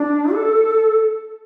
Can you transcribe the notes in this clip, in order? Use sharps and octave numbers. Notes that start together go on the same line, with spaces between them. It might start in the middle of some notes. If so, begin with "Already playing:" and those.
Already playing: D4
A4